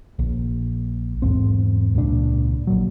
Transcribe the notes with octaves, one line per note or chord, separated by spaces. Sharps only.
A#1
E2 G#2 C4
C#2 A#2 D4
A#1 A#2 F#3